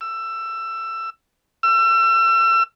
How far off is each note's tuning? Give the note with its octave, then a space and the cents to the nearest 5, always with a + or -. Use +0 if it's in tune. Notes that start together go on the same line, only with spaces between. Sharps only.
E6 +20
E6 +35